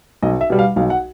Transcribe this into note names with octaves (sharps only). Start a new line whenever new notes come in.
B1 D#5
E5
B2 G3
F5
B1 F5
F#5